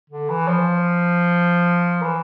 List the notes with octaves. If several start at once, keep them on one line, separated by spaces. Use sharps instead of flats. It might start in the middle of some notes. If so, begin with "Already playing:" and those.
D3
E3
F3
E3